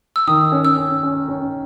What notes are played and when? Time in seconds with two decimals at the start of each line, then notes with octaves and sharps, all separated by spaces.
0.16 E6
0.27 D#3 D#6
0.52 C#4
0.65 E6
0.77 C#4
1.03 C#4
1.28 C#4